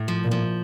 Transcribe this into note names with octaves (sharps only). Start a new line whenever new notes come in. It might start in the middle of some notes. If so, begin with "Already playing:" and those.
Already playing: A2
F3
A#2
F3